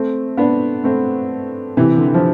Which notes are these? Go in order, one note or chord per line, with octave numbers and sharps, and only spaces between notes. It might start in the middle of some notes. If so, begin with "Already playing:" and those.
Already playing: A3 C4
B3 D4
A3 C4
C3 E3
D3
E3
F3